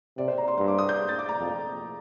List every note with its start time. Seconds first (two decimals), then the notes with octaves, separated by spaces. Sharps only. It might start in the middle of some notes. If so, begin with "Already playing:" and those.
0.17 C3 D5
0.28 C5
0.38 A#5
0.48 C6
0.58 G2 C6
0.68 D6
0.78 D#6
0.89 G6
1.09 A6
1.19 D6
1.29 A#5
1.39 F2